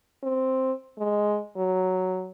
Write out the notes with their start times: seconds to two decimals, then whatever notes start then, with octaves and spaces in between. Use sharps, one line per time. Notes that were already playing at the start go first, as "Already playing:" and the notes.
0.23 C4
0.98 G#3
1.57 F#3